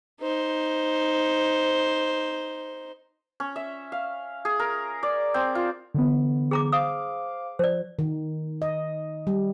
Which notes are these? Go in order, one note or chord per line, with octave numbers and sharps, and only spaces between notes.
D#4 C5
C#4
E5
F5
G#4
A#4
D5
C4
F4
D3 E3 B3
G#4 A#5 D6
C5 F5 D6 D#6
F3 C5 D5
D#3
D#5
G3